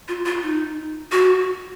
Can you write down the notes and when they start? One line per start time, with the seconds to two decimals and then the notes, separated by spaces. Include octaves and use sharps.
0.08 F4
0.25 F4
0.43 D#4
1.12 F#4